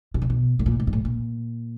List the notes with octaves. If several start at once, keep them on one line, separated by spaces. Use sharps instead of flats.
B2
C3
B2
A2
A#2
A2
G#2
A2
A#2